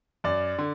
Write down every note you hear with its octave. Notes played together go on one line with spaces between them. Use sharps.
F#2 D5
D3